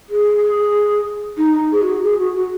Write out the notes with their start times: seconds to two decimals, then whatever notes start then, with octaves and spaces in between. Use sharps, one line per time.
0.09 G#4
1.38 D#4
1.72 G#4
1.82 F#4
2.03 G#4
2.19 F#4
2.35 F#4